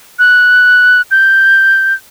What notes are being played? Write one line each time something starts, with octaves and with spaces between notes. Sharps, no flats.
F#6
G6